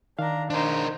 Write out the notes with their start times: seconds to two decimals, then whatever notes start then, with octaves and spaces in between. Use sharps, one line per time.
0.19 D#3 D4 F5 A#5
0.50 D4 D#4 A#4 C5